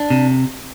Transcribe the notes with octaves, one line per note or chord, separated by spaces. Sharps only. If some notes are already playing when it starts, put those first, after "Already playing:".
Already playing: D4
C3